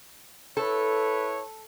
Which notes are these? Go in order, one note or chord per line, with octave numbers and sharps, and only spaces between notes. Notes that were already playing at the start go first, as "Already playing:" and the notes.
E4 A4 B4 C#5